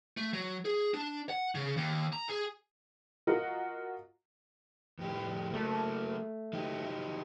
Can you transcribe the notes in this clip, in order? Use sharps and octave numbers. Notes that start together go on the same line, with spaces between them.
A3
F#3
G#4
D4
F#5
C#3
D#2
A#5
G#4
F4 F#4 A#4 D#5 F#5
F2 A2 G4
F#3 A3 A#3
F#3 D#4 G4